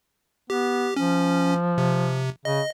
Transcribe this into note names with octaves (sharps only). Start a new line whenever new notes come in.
B3 G4
F3 C#4
C3
C#3 D#5